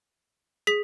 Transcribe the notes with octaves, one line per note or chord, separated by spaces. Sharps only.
G#4 B6